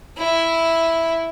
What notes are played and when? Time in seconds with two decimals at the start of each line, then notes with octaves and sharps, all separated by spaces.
0.18 E4